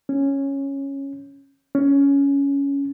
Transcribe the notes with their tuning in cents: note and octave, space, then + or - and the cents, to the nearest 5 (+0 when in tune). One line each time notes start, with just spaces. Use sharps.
C#4 -10
C#4 +10